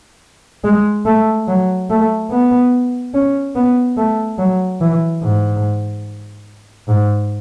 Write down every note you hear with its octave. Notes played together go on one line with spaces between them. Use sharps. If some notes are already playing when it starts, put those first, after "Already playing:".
G#3
A3
F#3
A3
B3
C#4
B3
A3
F#3
E3
G#2
G#2